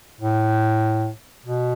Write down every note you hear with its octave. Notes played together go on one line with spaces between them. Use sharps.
A2
B2